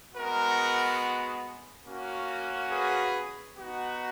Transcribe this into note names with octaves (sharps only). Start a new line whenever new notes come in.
G#3 B3 F#4 A#4
A#3 C#4 F#4
G#4 B4
B3 D#4 F#4